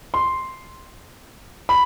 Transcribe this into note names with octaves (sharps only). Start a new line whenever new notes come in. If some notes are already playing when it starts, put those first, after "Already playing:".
C6
B5